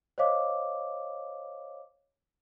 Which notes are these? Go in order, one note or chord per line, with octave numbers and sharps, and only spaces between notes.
C5 C#5 D#5 F5 D6